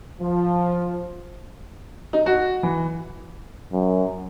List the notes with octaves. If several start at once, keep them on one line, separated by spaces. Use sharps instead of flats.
F3
D#4
F#4
E3
F#2